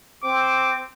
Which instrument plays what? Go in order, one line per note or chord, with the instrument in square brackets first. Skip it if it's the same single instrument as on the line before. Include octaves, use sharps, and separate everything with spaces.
[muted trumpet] C4 [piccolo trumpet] D6